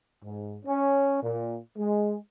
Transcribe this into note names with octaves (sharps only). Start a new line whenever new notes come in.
G#2
C#4
A#2
G#3